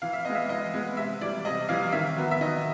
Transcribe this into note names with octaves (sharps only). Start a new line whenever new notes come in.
E3 F5
E5
G#3 B3 D#5
E5
E3 D#5
G#3 B3
C3 E5
E3 G3 D5
C3 D#5
E3 G3 F5
D#3 E5
F#3 B3
E5
D#3 D#5